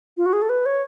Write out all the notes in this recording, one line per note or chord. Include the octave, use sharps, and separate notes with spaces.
F4
F#4
G#4
A4
B4
C#5